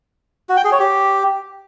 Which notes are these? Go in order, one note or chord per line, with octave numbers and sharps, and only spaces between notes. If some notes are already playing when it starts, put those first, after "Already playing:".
F#4
G5
G#4
C#5
G4